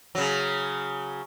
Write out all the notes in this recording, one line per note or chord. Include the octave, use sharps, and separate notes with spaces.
C#3 F#3